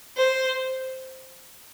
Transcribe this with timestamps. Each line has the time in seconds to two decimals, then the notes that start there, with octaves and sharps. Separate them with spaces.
0.17 C5